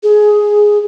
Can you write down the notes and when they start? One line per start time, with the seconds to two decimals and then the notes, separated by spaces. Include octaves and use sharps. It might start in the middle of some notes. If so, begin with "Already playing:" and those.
0.03 G#4